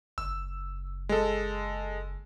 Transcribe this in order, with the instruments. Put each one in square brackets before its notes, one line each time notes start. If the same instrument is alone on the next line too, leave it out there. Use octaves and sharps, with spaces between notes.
[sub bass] F#1 [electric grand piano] E6
[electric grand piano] G#3 A4